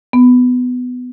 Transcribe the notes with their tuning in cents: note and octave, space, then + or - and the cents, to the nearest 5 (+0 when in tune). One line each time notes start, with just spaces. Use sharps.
B3 +15